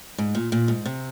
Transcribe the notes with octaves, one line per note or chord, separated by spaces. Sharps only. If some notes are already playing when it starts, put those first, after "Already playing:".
G#2
A#2
A#2
G#2
C3